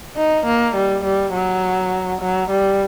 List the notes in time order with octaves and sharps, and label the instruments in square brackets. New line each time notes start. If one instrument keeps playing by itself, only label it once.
[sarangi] D#4
A#3
G3
G3
F#3
F#3
G3